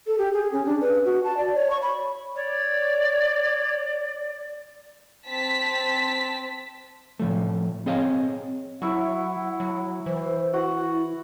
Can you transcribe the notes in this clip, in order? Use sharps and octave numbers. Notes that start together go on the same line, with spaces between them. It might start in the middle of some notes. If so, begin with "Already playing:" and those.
A4
G4
G#4
C#4
D4
B4
F#4
A5
D5
C#5
C#6
B5
C#5 D5
C4 A5 B6
A2 F3 A3
C4 G#4 C#5 D#5 F5
F#3 E4 F#5 C#6
F#3
E3 C5
E4 F#4 F#5